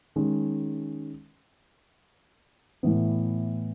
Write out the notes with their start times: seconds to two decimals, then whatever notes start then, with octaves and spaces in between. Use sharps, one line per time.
0.16 D#3 G#3 C#4
2.83 A2 E3 B3